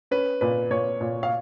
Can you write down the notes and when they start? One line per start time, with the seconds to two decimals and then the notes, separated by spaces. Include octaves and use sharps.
0.11 C#4 B4
0.41 A#2 B4
0.70 A#2 C#5
1.01 A#2
1.23 F5